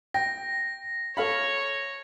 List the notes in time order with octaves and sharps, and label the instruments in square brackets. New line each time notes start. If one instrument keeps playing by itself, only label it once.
[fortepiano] G5 [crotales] A#6
[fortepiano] A4 F5 B5 [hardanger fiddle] C#5